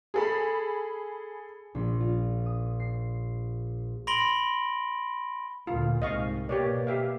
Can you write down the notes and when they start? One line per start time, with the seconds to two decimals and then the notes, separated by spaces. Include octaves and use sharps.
0.14 G#4 A4 B5
1.75 A#1
2.00 F4
2.46 D#6
2.80 C7
4.07 B5 C6 A#6 D7 F#7 G7
5.67 D2 A#2 F4
6.02 C2 G#2 D#5 F5 C#6
6.49 B2 A#3 G4 C#5 D5
6.87 G4 E5 F5